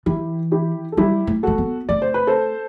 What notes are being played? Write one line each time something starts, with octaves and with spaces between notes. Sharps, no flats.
E3 E4 G4
E4 G4
A4
G3 E4 G4
A3
A3 F#4 A4
B3
A3 D5
C5
B4
A4 C5